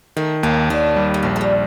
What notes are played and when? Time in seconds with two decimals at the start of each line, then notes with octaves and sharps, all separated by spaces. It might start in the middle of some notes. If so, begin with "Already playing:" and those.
0.16 D#3 A3
0.43 D#2 A#3
0.70 D#2 D4
0.96 G3
1.14 A3
1.23 A#1 A#3
1.36 A3
1.41 G3